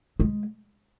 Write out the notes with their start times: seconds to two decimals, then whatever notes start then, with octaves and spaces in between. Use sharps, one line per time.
0.20 G#3